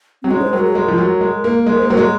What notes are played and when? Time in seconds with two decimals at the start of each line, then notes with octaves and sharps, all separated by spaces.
0.22 F#3 C4
0.31 G#3 C#4
0.41 C5
0.53 F#3 A#4
0.64 G#4
0.75 G#3 A#4
0.88 F3
0.98 F#3
1.21 G#3
1.44 A#3
1.66 G#3 A#4
1.78 C5
1.82 A#3
1.89 F#3 A#4
1.97 G#3 G#4